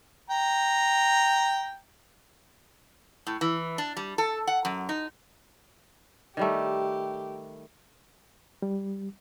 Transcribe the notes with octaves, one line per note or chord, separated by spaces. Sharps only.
G5 A#5
A2
E3
D4
G3
A4
F#5
F#2
D#4
D#3 G3 A3 G4
G3